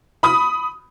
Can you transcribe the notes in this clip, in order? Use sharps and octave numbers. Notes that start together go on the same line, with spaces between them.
B5 D#6